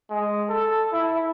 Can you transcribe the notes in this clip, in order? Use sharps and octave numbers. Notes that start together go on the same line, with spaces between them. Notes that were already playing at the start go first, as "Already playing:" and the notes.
G#3
A4
E4